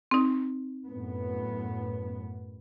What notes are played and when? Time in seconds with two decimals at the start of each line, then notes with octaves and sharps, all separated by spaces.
0.11 C4 D#4
0.88 F#2 A2 B3